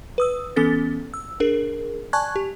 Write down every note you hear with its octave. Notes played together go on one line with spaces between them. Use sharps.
B4 D#6 E6
E3 B3 C#4 A4 A6
E6
D4 G#4 A#4
D5 G#5 A5 C#6 F#6 G#6
G4